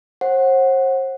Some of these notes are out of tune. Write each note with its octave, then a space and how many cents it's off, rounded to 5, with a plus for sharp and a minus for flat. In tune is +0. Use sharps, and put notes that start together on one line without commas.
C5 +40 F#5 +0